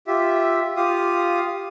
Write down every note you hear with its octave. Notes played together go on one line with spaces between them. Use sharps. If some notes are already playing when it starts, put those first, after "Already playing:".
F4 G4 E5
F4 G4 F5 D#6